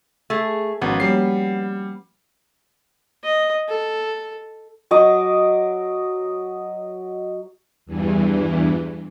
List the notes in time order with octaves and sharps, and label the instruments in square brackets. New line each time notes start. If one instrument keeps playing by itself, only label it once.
[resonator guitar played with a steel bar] A3 G#4
[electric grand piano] G#1 [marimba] F3 C#4 F#4 [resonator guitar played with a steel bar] B3
[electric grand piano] G3 C7 [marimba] A#3 C#5
[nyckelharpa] D#5
A4
[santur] F#3 D#5 D6
[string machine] E2 G2 E3